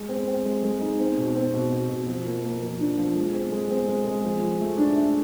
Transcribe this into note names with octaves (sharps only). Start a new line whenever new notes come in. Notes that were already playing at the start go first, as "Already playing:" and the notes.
Already playing: G#3
C4
C4
G#3
G#3
D#4
C4
B2
C4
B2
B2
B2
F3
A#3
A#3
F3
D4
F3
G#3
C4
G#3
C4
G#3
G#3
F3
F3
A3
D4
A3